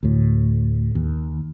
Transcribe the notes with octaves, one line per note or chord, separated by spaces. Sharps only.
D2 A2
D#2